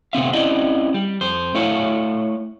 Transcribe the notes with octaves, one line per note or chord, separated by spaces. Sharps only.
C3 A3 B3 C4 E5 F5
C4 C#4 E4 G4 D5 D#5
G3
F2 C5
A3 E4 C#5 F5